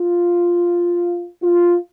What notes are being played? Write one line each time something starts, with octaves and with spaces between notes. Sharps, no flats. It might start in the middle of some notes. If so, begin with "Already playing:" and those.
Already playing: F4
F4